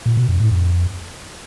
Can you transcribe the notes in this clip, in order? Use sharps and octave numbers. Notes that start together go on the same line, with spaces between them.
A#2
B2
F2
A2
F2